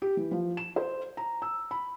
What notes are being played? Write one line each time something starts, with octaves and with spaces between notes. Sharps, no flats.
G4
E3
F3
E7
C5
A#5
E6
B5